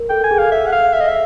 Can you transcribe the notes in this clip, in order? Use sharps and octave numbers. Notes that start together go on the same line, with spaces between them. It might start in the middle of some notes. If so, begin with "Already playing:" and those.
Already playing: A#4
A4 G5
G#5
G#4
F5
A4
E5
G#4
F#5
F5
E5
D#5
E5